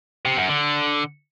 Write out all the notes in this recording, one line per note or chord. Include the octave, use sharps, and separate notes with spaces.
C3
F#2
D3